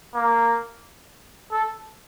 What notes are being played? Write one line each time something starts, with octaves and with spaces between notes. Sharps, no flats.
A#3
A4